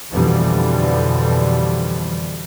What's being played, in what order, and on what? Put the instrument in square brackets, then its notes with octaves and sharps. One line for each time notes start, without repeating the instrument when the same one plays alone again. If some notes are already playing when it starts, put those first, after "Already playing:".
[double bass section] F2 B2 D3 E3 F3 G3